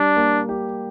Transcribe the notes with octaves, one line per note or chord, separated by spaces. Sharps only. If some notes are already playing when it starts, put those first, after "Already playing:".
Already playing: G3 D4
A#3
G4